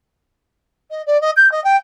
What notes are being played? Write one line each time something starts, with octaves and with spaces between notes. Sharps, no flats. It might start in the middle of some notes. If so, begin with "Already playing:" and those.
D#5
D5
D#5
G6
D#5
G5